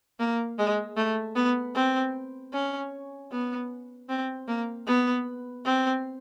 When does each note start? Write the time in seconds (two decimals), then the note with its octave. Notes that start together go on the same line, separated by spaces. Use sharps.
0.20 A#3
0.58 G#3
0.97 A3
1.36 B3
1.75 C4
2.53 C#4
3.31 B3
4.09 C4
4.48 A#3
4.87 B3
5.65 C4